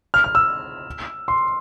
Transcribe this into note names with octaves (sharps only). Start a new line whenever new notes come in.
F6
F6
E6
C6